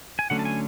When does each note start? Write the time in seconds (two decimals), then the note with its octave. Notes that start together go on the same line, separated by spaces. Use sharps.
0.19 G#5
0.30 D3 F#3 A3 C#4 F#5
0.39 A5
0.45 G#5